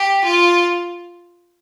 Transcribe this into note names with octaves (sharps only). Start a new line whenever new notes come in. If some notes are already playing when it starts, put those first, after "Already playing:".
Already playing: G4
F4